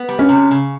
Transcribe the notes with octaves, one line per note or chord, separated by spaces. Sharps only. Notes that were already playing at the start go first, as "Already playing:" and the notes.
Already playing: B3
G3
C#4
C3
C#3